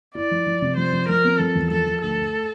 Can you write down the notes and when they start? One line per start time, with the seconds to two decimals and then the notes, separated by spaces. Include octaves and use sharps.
0.15 E4 D5
0.31 F3
0.46 F3
0.62 C3
0.77 F3 C5
0.93 F3
1.09 F3 A#4
1.24 C4
1.39 F3 A4
1.55 E2
1.71 F3 A4
1.86 F3
2.01 D2 A4
2.17 A3